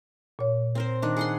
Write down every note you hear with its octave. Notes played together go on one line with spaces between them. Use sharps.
A#2 C#5
C4 A#4 C5
D#3 D4
G#4 F#5 C6